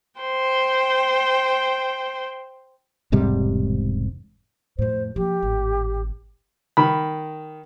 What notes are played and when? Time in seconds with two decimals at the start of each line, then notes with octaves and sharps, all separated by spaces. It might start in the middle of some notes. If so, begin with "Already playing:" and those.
0.20 C5 G5
3.12 E1 G#2 C3 G3
4.79 F2 A2 C5
5.16 F3 A#3 G4
5.43 G#1 A2
6.77 D#3 B5